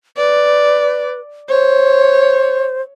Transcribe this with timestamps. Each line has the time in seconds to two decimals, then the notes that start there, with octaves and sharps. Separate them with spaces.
0.17 B4 D5
1.49 C5 C#5